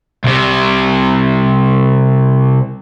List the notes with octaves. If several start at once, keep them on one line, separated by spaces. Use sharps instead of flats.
C2 C3